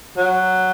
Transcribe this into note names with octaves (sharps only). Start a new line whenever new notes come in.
F#3